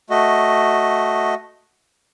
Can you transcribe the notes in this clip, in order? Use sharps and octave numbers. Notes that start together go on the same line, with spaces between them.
A3 F#4 D#5